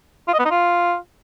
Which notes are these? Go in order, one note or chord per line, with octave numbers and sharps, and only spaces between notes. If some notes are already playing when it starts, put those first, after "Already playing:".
F4
D#5
B3
D#4
F4